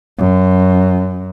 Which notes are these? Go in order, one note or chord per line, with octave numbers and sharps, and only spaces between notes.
F#2